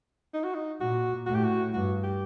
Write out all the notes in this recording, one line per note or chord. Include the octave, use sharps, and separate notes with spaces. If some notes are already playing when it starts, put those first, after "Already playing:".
D#4
F#4
D#4
A#2 F#4
A2 F#4
G4
F#4
G2 F#4
G4